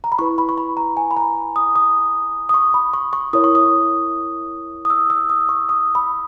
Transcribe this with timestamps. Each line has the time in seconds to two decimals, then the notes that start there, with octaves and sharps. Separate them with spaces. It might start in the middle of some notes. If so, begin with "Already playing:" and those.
0.04 A#5
0.12 B5
0.19 E4 B4 C#6
0.38 B5
0.49 C#6
0.58 B5
0.77 A#5
0.97 G#5
1.11 B5
1.17 A#5
1.56 D#6
1.76 D#6
2.49 D#6
2.54 C#6
2.74 B5
2.94 C#6
3.13 C#6
3.33 E4 A#4 C#5 D#6
3.44 C#6
3.55 D#6
4.85 D#6
4.90 E6
5.10 E6
5.29 D#6
5.49 C#6
5.69 D#6
5.95 B5